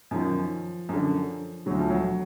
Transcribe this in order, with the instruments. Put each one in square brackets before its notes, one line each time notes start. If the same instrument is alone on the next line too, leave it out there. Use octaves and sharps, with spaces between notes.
[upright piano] F#2 D#3 F3
F#2 D3
D2 D3 F#3
F3
F#3